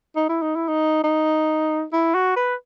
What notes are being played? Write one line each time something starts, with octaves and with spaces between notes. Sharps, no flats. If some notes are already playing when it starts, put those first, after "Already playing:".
D#4
E4
D#4
E4
D#4
D#4
E4
F#4
B4